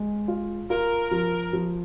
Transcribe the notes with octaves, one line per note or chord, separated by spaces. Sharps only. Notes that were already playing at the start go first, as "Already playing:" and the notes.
Already playing: G#3
F4
F4 A#4
F3
F3